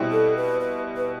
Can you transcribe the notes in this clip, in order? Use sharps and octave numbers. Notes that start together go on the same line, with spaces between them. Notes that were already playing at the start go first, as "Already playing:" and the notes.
Already playing: B2 G3 C4 E4
A4
B4
B4
B4